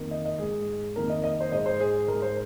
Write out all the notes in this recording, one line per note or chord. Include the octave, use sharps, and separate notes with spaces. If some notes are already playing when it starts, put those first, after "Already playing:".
Already playing: F2 D#3 A#3
D#5
D#5
G#2 G#3 G#4
F2 D#3 A#3 A#4
D#5
D#5
C5
G#2 G#3 D#5
C5
G#4
G#2 G#3 A#4
C5